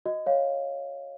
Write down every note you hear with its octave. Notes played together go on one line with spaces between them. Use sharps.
F#4 D#5
C#5 F5